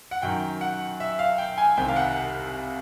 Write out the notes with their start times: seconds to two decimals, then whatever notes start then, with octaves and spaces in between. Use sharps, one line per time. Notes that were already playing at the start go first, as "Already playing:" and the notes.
0.11 F#5
0.22 F#2 D#3 G5
0.61 F#5
1.00 E5
1.19 F5
1.38 G5
1.58 G#5
1.77 C2 C3 D#3 G5
1.88 F5
1.96 F#5